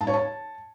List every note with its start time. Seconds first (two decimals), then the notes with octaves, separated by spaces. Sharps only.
0.01 A5
0.07 C#5
0.13 A5